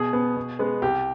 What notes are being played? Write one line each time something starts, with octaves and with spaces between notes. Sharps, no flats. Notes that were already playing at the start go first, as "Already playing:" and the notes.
Already playing: B2 G#4
B3
B2
G#3 B3
C2 G4